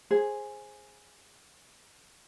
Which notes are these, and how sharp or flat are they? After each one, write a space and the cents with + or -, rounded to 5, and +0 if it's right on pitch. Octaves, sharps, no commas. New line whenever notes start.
G#4 +0 C5 +20